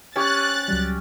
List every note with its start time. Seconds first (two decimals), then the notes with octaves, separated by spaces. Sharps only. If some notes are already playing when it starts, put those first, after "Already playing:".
0.16 C#4 G4 F#6 A6
0.68 C#2 F#3 G3